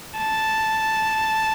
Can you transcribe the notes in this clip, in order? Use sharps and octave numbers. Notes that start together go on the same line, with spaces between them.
A5